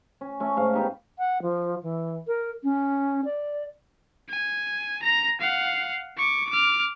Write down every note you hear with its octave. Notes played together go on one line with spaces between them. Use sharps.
C#4
A3 C#4
G#2 F5
B3 D#4 G4
F#5
F3
E3
A#4
C#4
D5
G#5
A#5 A#6
F5 F#5
C#6 D6
D6 F6